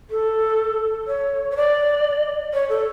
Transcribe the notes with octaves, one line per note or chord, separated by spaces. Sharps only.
A4
C#5
C#5
D5
C#5
A4